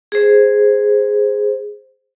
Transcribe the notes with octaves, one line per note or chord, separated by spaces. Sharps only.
G#4 C5